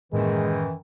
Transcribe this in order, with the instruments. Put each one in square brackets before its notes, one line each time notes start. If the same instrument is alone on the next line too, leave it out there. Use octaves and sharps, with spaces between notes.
[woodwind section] F#2 D#3 E3 [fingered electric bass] A2 A#3 [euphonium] G#3